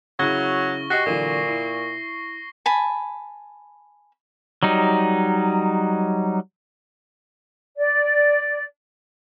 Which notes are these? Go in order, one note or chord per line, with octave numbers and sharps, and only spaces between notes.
C#3 F#3 E4 C#6 A#6 G7
F#4 G4 D#5 A#6 C7
A#2 D3 E3 F#3
E4
G#5 A5 B5
F#3 G3 D#4
D5